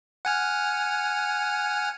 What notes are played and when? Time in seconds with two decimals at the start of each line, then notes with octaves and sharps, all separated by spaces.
0.25 F#5 G#5 F6